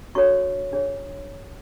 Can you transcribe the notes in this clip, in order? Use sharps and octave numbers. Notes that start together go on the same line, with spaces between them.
D4 F#4 A4 C#5 C#6
D4 G#4 C#5